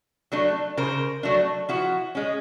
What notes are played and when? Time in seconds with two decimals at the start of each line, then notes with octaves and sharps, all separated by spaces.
0.32 F#3 A3 D4
0.77 C#3 A#4 C5
1.23 F#3 A3 D4
1.69 F3 E4 F#4
2.15 G#3 C#4